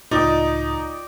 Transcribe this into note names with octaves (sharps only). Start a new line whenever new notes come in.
C#2 A2 D#4 F4 D5 D#5 G5